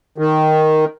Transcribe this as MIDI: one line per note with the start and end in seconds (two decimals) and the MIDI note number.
0.18 0.85 51